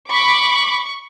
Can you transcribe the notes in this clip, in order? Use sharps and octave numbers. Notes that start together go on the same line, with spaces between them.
B5 C#6 D6